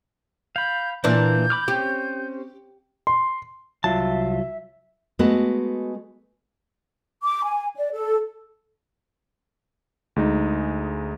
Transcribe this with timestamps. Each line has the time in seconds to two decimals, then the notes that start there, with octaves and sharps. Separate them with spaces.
0.56 F5 B5 G6
1.04 A#2 E3 A#3 D4 G6
1.50 B5 D6 F6
1.68 C4 C#4 G4
3.07 C6
3.84 C2 F#3 F4 E5 A5
5.19 G#3 A3 B3 F#4 A4 B4
7.23 D6
7.45 G#5
7.76 D5
7.92 A4
10.16 D2 G#3 D#4